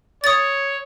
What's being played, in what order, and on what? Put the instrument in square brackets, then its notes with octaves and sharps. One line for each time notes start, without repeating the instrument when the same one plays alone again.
[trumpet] C#5 [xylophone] D#6 A6